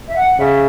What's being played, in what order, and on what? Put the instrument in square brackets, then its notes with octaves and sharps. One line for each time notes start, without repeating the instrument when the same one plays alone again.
[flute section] E5
F#5
[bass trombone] C#3 [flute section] E5